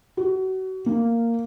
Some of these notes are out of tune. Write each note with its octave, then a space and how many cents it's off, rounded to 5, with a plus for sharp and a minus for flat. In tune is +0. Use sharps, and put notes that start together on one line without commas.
F#4 +30
A#3 -10